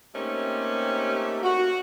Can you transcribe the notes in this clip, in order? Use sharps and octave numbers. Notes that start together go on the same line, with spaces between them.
A3 A#3 C4 C#4 D#4 G4
F#4